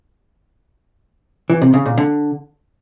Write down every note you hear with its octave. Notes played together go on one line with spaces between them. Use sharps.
E3
C3
C#3
A#2
D3